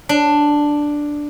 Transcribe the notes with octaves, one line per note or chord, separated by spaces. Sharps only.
D4